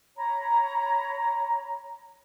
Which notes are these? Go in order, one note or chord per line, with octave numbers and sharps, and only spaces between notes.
C#5 A#5 B5